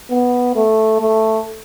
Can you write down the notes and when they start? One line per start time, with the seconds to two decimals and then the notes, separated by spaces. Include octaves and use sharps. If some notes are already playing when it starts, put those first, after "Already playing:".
0.11 B3
0.56 A3
1.01 A3